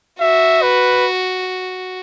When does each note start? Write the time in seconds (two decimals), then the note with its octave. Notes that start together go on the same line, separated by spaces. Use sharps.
0.20 F#4 E5
0.62 B4